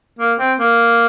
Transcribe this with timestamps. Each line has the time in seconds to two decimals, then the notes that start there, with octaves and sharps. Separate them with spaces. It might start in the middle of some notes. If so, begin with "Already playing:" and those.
0.19 A#3
0.39 C4
0.59 A#3